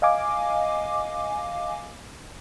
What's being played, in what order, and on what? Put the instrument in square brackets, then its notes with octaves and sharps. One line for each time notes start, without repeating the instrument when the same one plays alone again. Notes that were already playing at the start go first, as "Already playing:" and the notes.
[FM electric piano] D#5 F5 G#5 D6